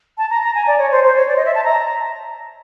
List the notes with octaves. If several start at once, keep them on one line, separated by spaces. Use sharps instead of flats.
A5
A#5
A#5
G#5
D5
C#5
C5
C5
C#5
D5
D#5
E5
A5
A#5